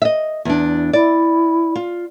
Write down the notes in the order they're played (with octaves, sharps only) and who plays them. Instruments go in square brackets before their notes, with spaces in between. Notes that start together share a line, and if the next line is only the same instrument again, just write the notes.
[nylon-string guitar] D#5 E5
E2 D4
[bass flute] E4 [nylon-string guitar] D5
[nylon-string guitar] F4